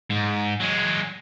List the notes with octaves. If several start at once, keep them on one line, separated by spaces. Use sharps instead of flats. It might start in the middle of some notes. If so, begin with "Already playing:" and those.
G#2
F#3 G#3